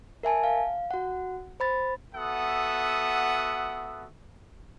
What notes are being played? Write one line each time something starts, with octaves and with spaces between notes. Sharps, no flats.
A#4 E5 G#5 A5
F5
F#4 F#5
C5 B5 A6
B3 F#4 A4 E5 F#5 D#6